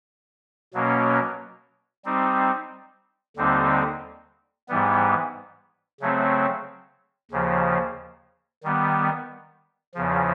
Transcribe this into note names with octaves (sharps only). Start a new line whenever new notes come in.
B2 F#3 A#3 C#4
G3 C4 D#4
D#2 D3 G3 C4 D#4
G#2 E3 G3 B3
C#3 F#3 A3 C4
D#2 C#3 F3
D#3 G3 B3
E2 C#3 F3